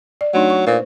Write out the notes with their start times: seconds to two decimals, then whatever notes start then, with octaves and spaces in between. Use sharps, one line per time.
0.21 D5
0.34 F#3 A3 D4 D#4
0.50 C#6
0.67 A#2 B4 C5